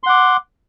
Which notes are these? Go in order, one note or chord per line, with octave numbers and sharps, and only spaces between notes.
F#5 C6 D6